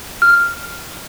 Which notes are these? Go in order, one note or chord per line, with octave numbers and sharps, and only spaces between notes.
F6